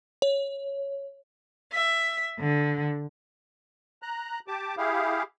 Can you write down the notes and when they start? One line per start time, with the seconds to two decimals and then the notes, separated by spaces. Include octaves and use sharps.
0.22 C#5
1.72 E5
2.37 D3
4.02 A#5 F#6
4.48 G4 A5 D6
4.77 E4 G4 G#4 F5